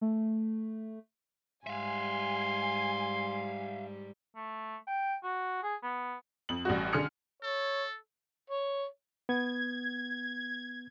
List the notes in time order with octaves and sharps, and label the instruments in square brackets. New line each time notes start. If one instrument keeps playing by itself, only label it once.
[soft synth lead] A3
[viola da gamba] G#2 G3 [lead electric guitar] E5 F5 [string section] G#5 [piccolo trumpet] C6
[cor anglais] A3
G5
F#4
G#4
B3
[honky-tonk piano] F2 F#7
A1 G3 F#4
D3 G#4 F6 C#7
[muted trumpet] A4 [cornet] C#5
[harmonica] C#5
[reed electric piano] B3 [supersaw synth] G#6